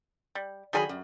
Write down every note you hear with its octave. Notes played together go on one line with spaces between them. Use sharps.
G3
D#3 F#3 G3 G#4 A#4 B5
F#2